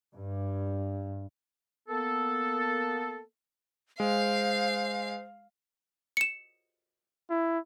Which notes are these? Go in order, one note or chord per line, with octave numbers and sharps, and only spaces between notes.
G2
A#3 B3 A4
G#3 C5 F5
C#7 E7
E4